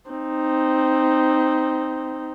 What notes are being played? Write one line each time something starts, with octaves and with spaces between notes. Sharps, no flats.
C4 D#4